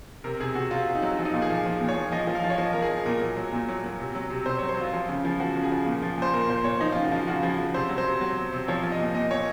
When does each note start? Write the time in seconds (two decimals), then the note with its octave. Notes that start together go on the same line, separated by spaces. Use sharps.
0.24 C3 A#4
0.40 C3 G#4
0.55 C3 F#4
0.71 C3 F4
0.87 C3
0.95 D#4
1.02 F#3
1.18 F3 F4
1.25 D#4
1.33 A#2 F4
1.42 G#4
1.50 F3
1.66 F3
1.81 A#2
1.89 C#5
1.96 F3
2.12 F3 D#5
2.27 F3
2.35 F5
2.44 F3
2.50 C#5
2.58 F3 D#5
2.73 F3 A#4
2.82 G#4
2.90 F3
3.06 A#2 A#4
3.21 F#3
3.37 F#3
3.53 A#2
3.69 F#3
3.84 F#3
4.00 C3
4.15 F#3
4.30 C3
4.46 C3 C5
4.58 C#5
4.62 F#3
4.69 C5
4.77 F#3 F4
4.93 F3
5.09 C#3
5.25 F3
5.40 F3 F#4
5.56 C#3
5.63 G#4
5.71 F3
5.86 A#2
6.02 F3
6.18 A#2 C5
6.34 A#2 A#4
6.49 A#2 C5
6.64 A#2 C#5
6.80 F3 D#4
6.92 F4
6.96 C#3
7.04 F#4
7.12 F3 F4
7.27 C#3 F#4
7.43 F3 G#4
7.58 F3
7.74 C3 C5
7.89 F#3
7.98 C5
8.06 C3
8.21 F#3
8.36 F#3
8.53 C3
8.68 F3 C#5
8.83 F3
8.92 D#5
8.99 A#2
9.15 A#2 D#5
9.31 A#2 C#5